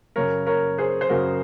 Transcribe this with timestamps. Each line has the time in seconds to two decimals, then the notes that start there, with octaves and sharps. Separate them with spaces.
0.16 F#2 C#3 A#4 C#5
0.47 A#4 C#5
0.78 G#4 C5
1.01 C5
1.09 F#2 C#3 F#4 A#4